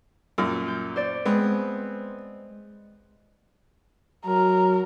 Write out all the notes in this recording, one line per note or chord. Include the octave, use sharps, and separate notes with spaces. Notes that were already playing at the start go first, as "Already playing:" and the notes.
F#2 A#2
G6
C5 D5
G#3 B3 C4
F#3 A#4